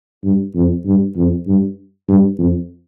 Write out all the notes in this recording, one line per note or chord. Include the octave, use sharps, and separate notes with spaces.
G2
F2
G2
F2
G2
G2
F2